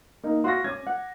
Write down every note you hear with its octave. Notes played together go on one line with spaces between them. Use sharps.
A#3 D#4
F#4 F5 C6 C#6 A#6
C#4 D6 G#6
F#5